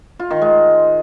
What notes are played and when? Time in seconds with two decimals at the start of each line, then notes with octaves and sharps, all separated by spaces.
0.19 F4
0.31 D#3
0.42 G#3